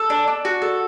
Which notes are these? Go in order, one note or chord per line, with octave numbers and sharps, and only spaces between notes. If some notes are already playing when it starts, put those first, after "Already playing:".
Already playing: A4
D4
D4
F#4
A4